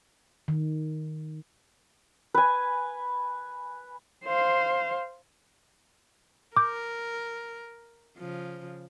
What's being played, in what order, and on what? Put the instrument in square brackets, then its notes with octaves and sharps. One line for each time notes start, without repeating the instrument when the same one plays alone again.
[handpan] D#3
[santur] B4 G#5
[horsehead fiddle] C5 F5
[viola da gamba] A#4 [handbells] D6 G6
[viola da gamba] C#3 F3